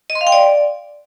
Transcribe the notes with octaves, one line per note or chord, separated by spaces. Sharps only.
D#5
C6
F5
G5
D5